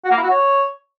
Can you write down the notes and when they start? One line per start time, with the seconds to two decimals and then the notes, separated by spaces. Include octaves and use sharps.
0.04 F#4
0.11 A#3
0.17 E4
0.23 F#4
0.29 C#5